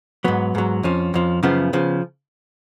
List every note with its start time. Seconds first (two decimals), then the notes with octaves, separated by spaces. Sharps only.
0.24 G#2 F#3 B3
0.55 G#2 F#3
0.83 F2 F3 C#4
1.14 F2 F3
1.43 F#2 C#3 F3 B3
1.73 C#3 F3